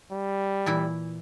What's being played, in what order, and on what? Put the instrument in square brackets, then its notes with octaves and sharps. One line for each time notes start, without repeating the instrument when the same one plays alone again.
[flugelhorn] G3
[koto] A#2 E3 E4